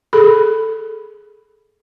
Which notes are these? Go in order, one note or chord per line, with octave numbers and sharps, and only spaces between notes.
G#4 A4 B5